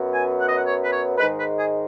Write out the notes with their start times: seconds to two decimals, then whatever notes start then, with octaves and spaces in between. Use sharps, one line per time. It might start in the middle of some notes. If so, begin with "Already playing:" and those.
Already playing: F#2 F#3 B3
0.13 G#5
0.40 F#5
0.48 D#5
0.56 F#5
0.66 C#5
0.83 B4
0.92 C#5
1.18 G#2 D#3 G#3 B4
1.38 B4
1.58 G#4